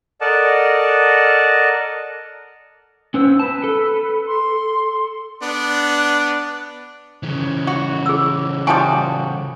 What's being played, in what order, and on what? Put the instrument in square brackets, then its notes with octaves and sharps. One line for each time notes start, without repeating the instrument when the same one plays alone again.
[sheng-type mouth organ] A4 A#4 D5 D#5 F#5 A5
[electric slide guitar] C#4 B4 C5 [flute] E6
[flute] B4 [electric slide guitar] A5
[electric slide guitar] A4
[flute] C6
[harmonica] B3 D4
[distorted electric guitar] C#3 E3
[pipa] F#4
[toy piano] G#4 E6
[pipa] G3 F4 F#4 [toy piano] G#5 A5 D#6